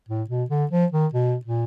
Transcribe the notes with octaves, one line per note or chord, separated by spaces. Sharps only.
A2
B2
D3
F3
D#3
B2
A#2